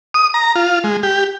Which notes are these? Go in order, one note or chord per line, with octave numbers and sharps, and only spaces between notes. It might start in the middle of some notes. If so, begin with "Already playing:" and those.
D#6
A#5
F4
G#3
G4